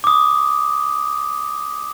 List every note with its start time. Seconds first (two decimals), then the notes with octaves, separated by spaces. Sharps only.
0.04 D6 D#6